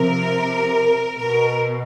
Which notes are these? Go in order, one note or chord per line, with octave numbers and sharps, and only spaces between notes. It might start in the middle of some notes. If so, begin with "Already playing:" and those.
Already playing: C3 F3 A#4
B2 A#4